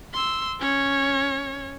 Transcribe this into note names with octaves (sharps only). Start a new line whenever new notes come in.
C6 E6
C#4 C#5